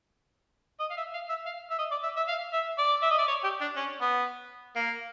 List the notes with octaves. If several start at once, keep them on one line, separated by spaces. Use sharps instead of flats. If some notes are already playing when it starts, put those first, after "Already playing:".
D#5
F5
E5
F5
E5
F5
E5
D#5
D5
E5
E5
F5
E5
D5
E5
D#5
D5
C#5
G4
D4
C#4
B3
A#3